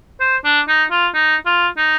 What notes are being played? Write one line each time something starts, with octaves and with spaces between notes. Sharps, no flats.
C5
D4
D#4
F4
D#4
F4
D#4